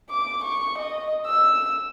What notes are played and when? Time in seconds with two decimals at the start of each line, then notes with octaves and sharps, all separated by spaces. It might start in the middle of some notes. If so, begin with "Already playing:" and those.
0.10 D6
0.44 C#6
0.79 D#5
1.26 E6